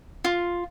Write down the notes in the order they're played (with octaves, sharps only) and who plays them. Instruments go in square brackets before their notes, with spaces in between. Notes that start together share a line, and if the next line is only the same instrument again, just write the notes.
[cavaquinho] F4